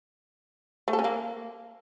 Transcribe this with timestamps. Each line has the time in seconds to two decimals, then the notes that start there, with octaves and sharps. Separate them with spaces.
0.88 A3
0.93 A4
0.99 C#4
1.04 A#3